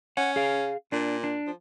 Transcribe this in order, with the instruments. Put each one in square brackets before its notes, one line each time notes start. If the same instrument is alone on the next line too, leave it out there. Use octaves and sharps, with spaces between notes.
[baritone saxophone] C#4 [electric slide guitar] F#5
[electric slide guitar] G#4 F5
[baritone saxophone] A#2 [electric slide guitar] D4
[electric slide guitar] D4
[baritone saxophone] F3